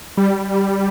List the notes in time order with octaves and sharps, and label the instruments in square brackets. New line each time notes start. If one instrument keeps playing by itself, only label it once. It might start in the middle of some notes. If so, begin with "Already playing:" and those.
[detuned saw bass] G3